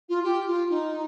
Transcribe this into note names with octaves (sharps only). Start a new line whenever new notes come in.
F4
G4
F4
D#4